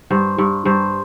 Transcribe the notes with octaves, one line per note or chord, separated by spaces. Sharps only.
G2 C5
G2
G2 C5